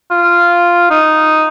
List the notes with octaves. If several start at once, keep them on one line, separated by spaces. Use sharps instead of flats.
F4
D#4